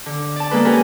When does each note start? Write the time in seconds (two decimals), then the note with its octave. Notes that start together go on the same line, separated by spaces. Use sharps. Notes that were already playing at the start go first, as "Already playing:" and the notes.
0.06 D3
0.36 D5 A5
0.51 G#3 A#3 A4 B4
0.65 C#4 G4 A#4 B4 G#5